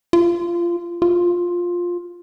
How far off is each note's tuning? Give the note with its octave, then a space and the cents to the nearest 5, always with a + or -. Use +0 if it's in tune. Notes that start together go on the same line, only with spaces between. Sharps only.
F4 -20
F4 +10